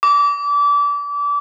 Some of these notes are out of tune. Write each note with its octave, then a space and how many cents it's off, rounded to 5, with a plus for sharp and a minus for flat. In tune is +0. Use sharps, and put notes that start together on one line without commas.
D6 -30